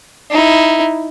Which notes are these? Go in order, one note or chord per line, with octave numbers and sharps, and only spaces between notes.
D#4 E4